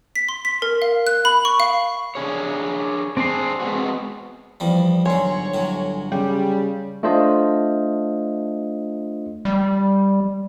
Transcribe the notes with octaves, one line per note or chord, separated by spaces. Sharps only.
B6
C6
B6
A#4
F5
F#6
B5
C#6
F5
D4 G#4 C#5
C4 D4 G#4 C6
G#3 B3 F#4
E2 F3 G3
G1 G#2 F#3 C#5 G#5 C6
A2 F#3
C#3 G3
A3 D4 F4 C5 D#5
G3